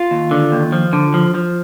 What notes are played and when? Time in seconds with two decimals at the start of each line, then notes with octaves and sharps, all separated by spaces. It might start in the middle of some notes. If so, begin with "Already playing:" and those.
Already playing: F4
0.11 D#2
0.31 D3
0.52 D#2
0.72 F3
0.93 D3
1.14 F3
1.34 F3